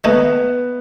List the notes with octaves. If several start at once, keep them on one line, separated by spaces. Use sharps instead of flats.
D#3 A3 B3 D#4